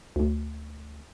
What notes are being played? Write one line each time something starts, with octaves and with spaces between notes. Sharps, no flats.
D2